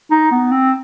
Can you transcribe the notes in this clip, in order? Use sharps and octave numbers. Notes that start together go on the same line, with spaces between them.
D#4
B3
C4